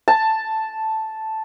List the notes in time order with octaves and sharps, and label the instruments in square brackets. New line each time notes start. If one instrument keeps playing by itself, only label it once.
[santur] A5